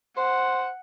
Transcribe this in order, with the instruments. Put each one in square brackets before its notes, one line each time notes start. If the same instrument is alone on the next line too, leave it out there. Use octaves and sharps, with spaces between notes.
[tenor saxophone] C5 [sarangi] F#5